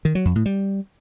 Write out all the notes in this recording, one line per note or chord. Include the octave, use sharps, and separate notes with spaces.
D#3
F#3
F2
A2
G3